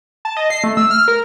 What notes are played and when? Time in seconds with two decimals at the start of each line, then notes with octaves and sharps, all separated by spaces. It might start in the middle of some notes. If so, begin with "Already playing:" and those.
0.25 A5
0.37 D#5
0.50 C7
0.64 A3
0.77 E6
0.91 F6
1.08 A#4